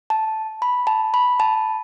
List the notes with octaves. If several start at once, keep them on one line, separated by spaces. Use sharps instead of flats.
A5
B5
A5
B5
A5